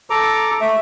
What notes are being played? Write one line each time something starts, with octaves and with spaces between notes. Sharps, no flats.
A4 A#5 D6
A3 E5